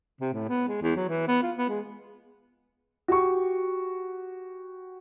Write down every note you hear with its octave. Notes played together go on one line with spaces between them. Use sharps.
C3
A2
B3
G#3
E2
F#3
E3
B3
F4
B3
G#3
F#4 G4 C#6